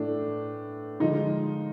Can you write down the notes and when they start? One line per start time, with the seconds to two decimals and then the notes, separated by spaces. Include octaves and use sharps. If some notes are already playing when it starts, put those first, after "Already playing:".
Already playing: A2 E3 A3 D4
1.00 D3 F3 G#3 D#4